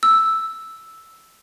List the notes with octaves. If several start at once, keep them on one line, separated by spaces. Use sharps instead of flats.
E6